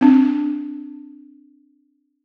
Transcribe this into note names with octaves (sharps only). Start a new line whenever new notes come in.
C4 D4